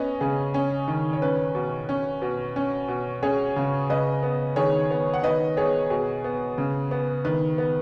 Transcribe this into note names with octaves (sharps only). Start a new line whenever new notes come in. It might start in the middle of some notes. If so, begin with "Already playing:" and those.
Already playing: B3 C#4 B4 D#5
C#3 G#4
C#4
D#3
C#5
C#4 B4
B2
C#4
B2
C#4
B2
C#4 G#4 C#5
C#3
C#3 B4 D#5
B3
D#3 G#4 C#5
B3
F#5
D#3 B4 D#5
B3 G#4 C#5
B2 G#4
B3
C#3
B3
D#3 B4
B3